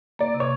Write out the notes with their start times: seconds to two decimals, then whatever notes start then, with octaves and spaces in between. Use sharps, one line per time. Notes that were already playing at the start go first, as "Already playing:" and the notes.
0.19 A#3 D5
0.34 C3
0.40 C#5